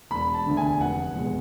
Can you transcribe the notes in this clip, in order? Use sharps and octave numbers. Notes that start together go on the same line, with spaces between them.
E1 B5
A5
D2 D3
G#5
F1 F#5
E2 B2 G#3